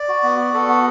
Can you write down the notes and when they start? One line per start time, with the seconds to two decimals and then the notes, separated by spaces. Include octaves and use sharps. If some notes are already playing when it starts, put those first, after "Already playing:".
Already playing: D5
0.09 F#4
0.23 B3
0.39 F#4
0.54 B3 A4
0.69 F#4